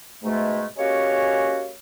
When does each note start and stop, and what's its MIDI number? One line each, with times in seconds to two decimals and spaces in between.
0.23 0.66 44
0.23 0.66 47
0.23 0.66 56
0.23 0.66 57
0.76 1.71 56
0.76 1.71 58
0.76 1.71 61
0.76 1.71 66
0.76 1.71 67
0.76 1.71 73